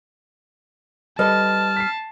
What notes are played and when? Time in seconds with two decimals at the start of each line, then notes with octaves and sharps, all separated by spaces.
1.19 G3 A4 B4 D#5 A5 F6
1.76 B6 C7